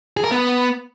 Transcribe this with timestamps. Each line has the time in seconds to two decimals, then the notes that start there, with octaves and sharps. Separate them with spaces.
0.17 G#4
0.24 A#4
0.31 B3